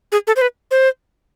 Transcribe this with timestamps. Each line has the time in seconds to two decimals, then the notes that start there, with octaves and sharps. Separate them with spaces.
0.12 G#4
0.27 A4
0.36 C5
0.42 B4
0.71 C5